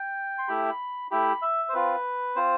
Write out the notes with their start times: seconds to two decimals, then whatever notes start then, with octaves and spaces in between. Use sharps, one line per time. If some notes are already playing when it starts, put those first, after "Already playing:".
Already playing: G5
0.38 C6
0.48 A3 E4 G4 B5
1.11 A3 E4 G4 B5
1.42 E5
1.69 C5
1.73 C4 F4 B4
2.36 C4 F4 C5